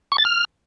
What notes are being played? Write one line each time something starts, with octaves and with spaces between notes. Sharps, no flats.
C#6
A6
F6